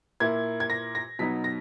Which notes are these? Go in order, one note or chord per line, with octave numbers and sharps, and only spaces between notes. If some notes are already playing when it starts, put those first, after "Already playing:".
A#2 A#3 E4 G#6
G#6
A#6
A#6
B2 F#3 B3 D#4 B6
A#6